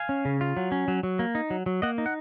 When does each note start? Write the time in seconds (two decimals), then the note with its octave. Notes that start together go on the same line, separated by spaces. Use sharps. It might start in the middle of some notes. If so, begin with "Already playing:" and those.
Already playing: F5 G#5
0.09 C#4
0.25 C#3
0.41 F4
0.57 F#3
0.72 C#4
0.88 F#3
1.03 F#3
1.19 A#3
1.35 D#4
1.50 F#3
1.66 F#3
1.82 A#3 D#5 F#5
1.98 D#4
2.06 F#5